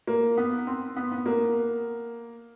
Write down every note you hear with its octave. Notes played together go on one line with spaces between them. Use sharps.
A#3
B3
C4
B3
B3
A#3